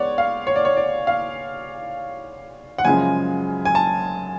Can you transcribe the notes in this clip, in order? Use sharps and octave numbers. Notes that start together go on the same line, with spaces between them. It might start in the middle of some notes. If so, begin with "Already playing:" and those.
Already playing: G#3 B3 C#5 D5 F#5
F5
C#5
D5
C#5
D5
F5
F#5
F#2 C#3 F3 G#3 G#5
G#5
A5